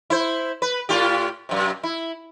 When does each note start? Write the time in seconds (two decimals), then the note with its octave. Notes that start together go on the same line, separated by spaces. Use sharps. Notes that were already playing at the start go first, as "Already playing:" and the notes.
0.10 E4 C5
0.62 B4
0.89 A2 F4 G4
1.49 F#2 C3
1.83 E4